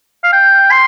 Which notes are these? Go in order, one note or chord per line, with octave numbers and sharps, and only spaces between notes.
F5
G5
C6